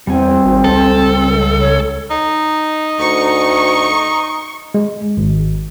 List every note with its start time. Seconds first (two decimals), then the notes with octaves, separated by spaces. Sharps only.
0.07 E2 G3 C4 G#5
0.45 G#1
0.64 C#2 A4
1.61 C#5
2.10 D#4
3.00 D2 C#6
4.74 G#3
5.17 G#1